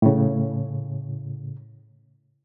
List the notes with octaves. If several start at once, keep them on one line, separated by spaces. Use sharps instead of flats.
A2 C#3